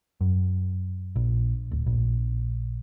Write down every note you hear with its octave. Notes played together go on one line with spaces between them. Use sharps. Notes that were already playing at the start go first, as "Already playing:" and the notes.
F#2
A#1
D1
A#1